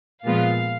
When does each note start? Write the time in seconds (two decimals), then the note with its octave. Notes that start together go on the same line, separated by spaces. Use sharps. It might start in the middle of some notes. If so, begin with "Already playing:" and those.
0.24 A#2 F3 G#3 B3 F4 F5